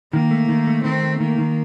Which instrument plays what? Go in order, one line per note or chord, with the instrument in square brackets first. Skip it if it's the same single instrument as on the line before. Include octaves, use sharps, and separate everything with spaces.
[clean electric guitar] D#3 [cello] A#3
[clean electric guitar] A3
D#3
A3
[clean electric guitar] D#3 [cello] C4
[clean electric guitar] A3
[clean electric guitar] D#3 [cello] A#3
[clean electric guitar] D#3